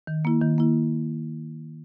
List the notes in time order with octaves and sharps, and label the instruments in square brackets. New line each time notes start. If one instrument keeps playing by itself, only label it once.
[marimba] D#3
A#3 E4
D#3
A#3 E4